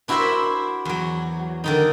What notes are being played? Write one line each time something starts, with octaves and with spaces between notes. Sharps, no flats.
D4 E4 F#4 A#4 C5 E5
E2 F#3
D3 D#3 D#4